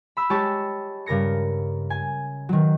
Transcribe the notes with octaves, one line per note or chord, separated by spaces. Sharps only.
B5 E6
G#3 G4 C#5 A5 C#6
G2 C#3 A#4 A#6 C#7
G#5
D#3 F#3